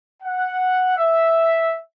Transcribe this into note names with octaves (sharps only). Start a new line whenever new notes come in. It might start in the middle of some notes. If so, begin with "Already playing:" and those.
F#5
E5